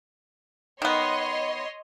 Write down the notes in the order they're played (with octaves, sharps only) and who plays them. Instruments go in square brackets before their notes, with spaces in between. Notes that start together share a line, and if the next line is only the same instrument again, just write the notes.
[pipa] D#3 B3 [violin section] C#5 D#5 C6